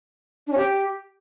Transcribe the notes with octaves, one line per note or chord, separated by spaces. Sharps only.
D4
C#4
G4